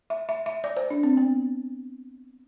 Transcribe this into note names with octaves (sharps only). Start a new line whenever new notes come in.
E5
E5
E5
D5
C5
D4
C4
B3